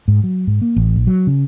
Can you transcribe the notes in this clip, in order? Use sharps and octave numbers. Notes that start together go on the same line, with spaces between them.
G#2
F#3
G#2
A#3
A1
A#1
F#3
C#3